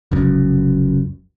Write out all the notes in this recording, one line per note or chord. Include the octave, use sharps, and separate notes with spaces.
F1 C#2 F#2